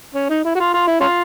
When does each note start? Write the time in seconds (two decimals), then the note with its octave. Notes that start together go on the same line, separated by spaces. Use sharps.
0.14 C#4
0.29 D#4
0.45 E4
0.55 F#4
0.60 F4
0.74 F4
0.87 E4
1.00 C#4 F4